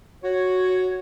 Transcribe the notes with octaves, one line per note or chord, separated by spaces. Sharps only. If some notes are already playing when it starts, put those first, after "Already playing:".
F#4 C#5